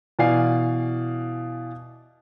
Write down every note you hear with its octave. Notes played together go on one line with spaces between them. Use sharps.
B2 E3 D5 F5 G#5 C7